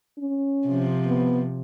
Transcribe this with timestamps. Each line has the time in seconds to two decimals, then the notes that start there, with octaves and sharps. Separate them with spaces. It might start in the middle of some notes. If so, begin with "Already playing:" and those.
0.18 C#4
0.67 C3 F3
1.07 B3